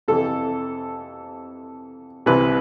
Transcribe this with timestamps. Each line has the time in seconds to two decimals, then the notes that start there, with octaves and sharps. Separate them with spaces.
0.08 F2 C3 E3 A4
2.26 C2 C3 E3 B4